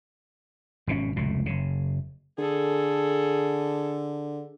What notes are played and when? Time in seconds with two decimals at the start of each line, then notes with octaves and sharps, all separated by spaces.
0.87 G#1 B2 D3 C#4
1.16 F1 C#2 A2
1.46 F#1 C#3
2.38 D3 G#4 A4